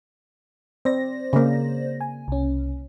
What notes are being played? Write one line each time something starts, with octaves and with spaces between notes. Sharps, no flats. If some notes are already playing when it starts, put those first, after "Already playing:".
C4 C5 D5 A#6
C#3 A#3
G#5
C2 C#4